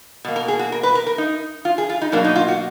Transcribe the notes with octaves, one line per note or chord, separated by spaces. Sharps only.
B2 A#3
A#4
G#4
F#4
A#4
B4
A#4
A#4
D#4
F4
G#4
F4
D#4
B2 F#3 A#3 D4
D#4
F4
F#4